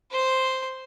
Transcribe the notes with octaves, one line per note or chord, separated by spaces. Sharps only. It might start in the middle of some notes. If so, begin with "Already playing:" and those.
C5 C6